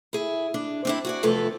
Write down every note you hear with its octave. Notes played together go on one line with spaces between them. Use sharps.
E4 G#4
D4
C4 D4 E4
F#4 G#4 D5
E2 C3 F3 A3 A4 B4